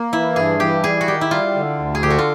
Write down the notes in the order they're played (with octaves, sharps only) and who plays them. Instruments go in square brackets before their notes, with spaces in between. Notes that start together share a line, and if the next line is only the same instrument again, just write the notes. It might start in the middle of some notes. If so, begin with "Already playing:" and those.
Already playing: [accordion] A#3
[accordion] E3 [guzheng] E4
[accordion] G2 [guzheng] G#4
[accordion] E3 [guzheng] G4
[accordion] G3 [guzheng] G#4
[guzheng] F#4
[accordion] D#3 [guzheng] G4
[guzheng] E4
[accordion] G3 [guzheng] F4
[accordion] D3
D2
[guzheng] G#4
[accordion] D3 [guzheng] G4
[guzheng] F#4
F4